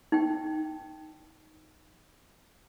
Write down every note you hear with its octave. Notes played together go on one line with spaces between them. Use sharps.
D#4 G5